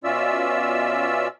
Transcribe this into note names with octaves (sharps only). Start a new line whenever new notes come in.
B2 C#4 F4 D5 E5 E6